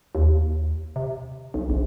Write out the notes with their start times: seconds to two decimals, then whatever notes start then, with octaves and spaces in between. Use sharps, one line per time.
0.15 D#2
0.96 C3
1.54 B1
1.70 A#1